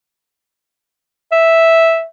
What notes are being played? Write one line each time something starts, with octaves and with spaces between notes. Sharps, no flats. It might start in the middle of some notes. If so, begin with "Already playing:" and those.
E5